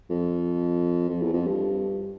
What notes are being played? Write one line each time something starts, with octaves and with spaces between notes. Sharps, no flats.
F2
F2
E2
F2
G2